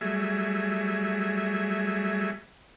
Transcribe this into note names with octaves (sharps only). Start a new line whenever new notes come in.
F#3 G3 A3 G#4 E5